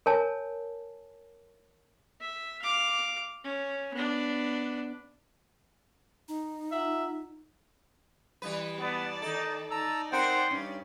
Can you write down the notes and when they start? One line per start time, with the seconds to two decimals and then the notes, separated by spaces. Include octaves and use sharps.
0.06 A#4 C#5 G#5 A5
2.21 E5
2.61 F5 D6
3.44 C#4
3.93 B3 D4
6.28 D#4 A#5
6.72 F4 E5 F#5 A#5
8.42 E3 G3 B4
8.79 B3 D5 A5
9.22 D#3 D#4 A4
9.71 D#4 D5 A5 A#5 E6
10.12 C4 A#4 C5 F#5 G5 C6
10.51 G2 C#4